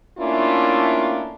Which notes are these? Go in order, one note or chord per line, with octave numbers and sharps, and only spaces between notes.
A3 A#3 C#4 D4 E4 F4